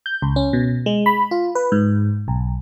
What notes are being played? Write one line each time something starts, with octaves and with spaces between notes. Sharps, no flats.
G6
C#2
C#4
B2
G#3
B5
F4
B4
G#2
B1